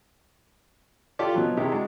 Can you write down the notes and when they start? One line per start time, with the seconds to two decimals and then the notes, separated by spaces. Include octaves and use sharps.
1.19 F4 G4 A4 D5
1.34 B2 F3 F#3
1.57 C3 D#3 E4 G4 G#4
1.72 G#3 D4 F#4